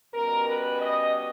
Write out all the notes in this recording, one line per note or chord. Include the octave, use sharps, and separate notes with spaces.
B2 G3 C#4 A#4
B4
D#5